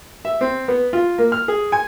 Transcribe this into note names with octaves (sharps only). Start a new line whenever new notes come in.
E5
C4
B3
F4
A#3
F6
G#4
G#5